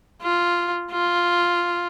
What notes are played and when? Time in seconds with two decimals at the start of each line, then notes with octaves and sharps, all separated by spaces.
0.22 F4
0.92 F4